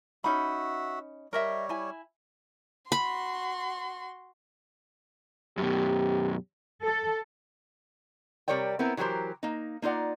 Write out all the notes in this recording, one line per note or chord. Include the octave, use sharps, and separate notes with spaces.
C#4 D#4 F#4 E5 B5
G3 A#4 C#5 D#5 E5
E4 G#5
F#4 B5 C6
F#2 B2 G4
A4
C3 G3 A#4 C#5 D5 G5
B3 C4 E4 A#4
E3 F#3 G4 A#4 C5
A#3 D#4
A#3 D#4 F4 D5 F#5